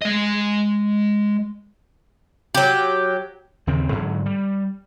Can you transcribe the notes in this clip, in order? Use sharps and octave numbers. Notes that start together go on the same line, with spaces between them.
G#3 D#5
F#3 G4
D#2 C#3 C4
G#2 D3 F#3
G3